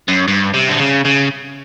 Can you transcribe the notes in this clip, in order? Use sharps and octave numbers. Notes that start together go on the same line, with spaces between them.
F#2
G2
C3
D3
C#3
C#3